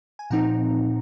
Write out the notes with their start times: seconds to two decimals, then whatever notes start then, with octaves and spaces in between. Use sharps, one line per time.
0.19 G#5
0.30 A#2 F3 C4 D#4 F#5 A#5